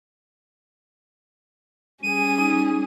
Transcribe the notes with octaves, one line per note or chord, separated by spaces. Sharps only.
G3 C#4 G#4 D#7
D#4